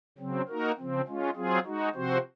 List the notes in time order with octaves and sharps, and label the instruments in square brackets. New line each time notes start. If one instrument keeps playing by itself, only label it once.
[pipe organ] C#3 F#3 C4
A#3 D#4 F#4 A#4
C#3 F3 C4
G#3 C#4 F4
F#3 C4 F4 G#4
G#3 D#4 F#4
C3 F3 C4 F#4 C5